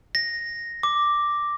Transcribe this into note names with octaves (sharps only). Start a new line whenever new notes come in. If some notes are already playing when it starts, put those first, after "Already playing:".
A#6
D6